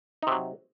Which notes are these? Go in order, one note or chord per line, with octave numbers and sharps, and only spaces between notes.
C3 F#3 D#4